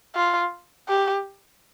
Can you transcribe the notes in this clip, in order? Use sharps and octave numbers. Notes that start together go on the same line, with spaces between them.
F4
G4